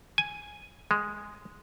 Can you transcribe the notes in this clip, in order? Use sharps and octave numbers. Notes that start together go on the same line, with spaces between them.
G#5
G#3